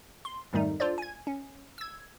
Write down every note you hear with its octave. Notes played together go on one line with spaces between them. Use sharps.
C6
F2 G#2 D#3 G3 A3 D#4
D4 F4 A4 C5 D5
G#5 G#6
C#4
E6 G#6